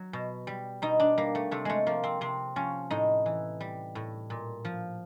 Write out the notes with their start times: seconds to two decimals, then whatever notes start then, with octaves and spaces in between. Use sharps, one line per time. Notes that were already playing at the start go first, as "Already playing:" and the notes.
Already playing: F#3
0.13 B2
0.47 G3
0.82 B2 D#4
1.00 D4
1.18 G3 A#3
1.35 A3
1.51 C3 A3
1.65 G#3 A3
1.86 F3 A#3
2.04 C4
2.21 C3 C4
2.56 F3 C#4
2.90 A2 D#4
3.26 E3
3.60 G3
3.95 A2
4.30 A#2
4.65 F3